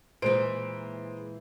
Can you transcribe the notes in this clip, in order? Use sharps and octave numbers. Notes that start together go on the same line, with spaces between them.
A#2 E3 G#3 C5 D7